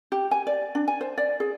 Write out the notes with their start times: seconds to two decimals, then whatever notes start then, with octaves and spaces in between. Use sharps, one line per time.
0.12 G4
0.31 G#5
0.47 D5
0.75 D4
0.88 G#5
1.01 C5
1.18 D5
1.40 G#4